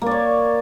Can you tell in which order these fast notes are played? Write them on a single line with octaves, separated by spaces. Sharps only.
A#3 D5 C#5